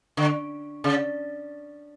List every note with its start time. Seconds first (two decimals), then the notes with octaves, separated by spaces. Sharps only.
0.17 D3
0.84 C#3